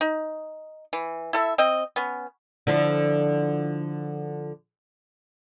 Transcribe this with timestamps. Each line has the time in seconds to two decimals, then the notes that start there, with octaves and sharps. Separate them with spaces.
0.01 D#4
0.93 E3
1.33 E4 A4 E5
1.58 C4 D#5
1.96 B3 C#4
2.67 D3 F3 E4